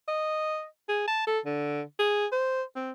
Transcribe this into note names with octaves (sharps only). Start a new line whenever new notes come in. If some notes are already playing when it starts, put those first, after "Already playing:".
D#5
G#4
A5
A4
D3
G#4
C5
C4